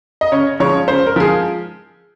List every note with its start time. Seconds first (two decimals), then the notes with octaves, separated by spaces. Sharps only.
0.21 D#5
0.32 C#3 C#5
0.60 F3 G#3 C#5
0.88 C#3 C5
1.06 A#4
1.16 F3 G#3 G#4